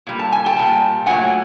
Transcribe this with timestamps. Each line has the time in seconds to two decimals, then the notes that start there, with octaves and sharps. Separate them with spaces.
0.07 A#2 G3
0.19 A5
0.32 G#5
0.46 G5 A5
0.56 A#2 G3
1.06 A#2 F#3 A3 F#5 G#5